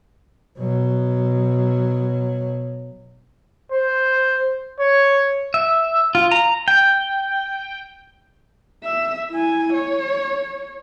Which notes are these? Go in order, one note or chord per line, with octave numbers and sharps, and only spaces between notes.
B2 F#3
C5
C#5
E5
F4
A#5
G5
E5
E4 G#5
C#5